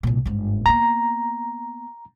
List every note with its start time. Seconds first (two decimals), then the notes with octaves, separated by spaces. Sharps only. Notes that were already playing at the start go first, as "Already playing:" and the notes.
0.03 C2 A#2
0.26 G1 G#2
0.66 A#3 B3 A#5